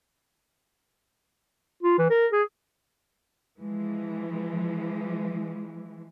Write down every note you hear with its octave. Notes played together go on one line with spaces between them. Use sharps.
F4
E3
A#4
G#4
E3 F3 G#3